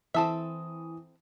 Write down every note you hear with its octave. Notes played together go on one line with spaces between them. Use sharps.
E3 C4 A4 E5 D#6